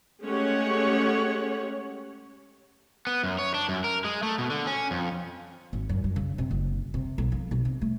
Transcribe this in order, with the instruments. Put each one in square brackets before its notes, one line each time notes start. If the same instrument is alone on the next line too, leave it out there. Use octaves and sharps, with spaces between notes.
[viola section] G#3 A3 C#4 G4 C#5 F#5
[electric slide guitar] B3
F#2
C#5
D4
F#2
A#4
G#3
A3
B2
D3
C#4
F2
[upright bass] G#1
F#2
F#2
C#3
C3
F#1
C3
B1
F3
B1
C3
A3